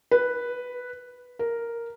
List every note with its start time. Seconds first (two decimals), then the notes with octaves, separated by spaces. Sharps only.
0.11 B4
1.39 A#4